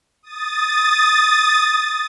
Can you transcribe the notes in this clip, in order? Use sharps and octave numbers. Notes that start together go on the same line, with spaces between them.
D#6 A6